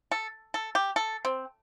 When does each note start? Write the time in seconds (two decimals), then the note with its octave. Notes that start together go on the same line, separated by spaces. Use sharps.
0.11 A4
0.54 A4
0.75 G4
0.96 A4
1.25 C4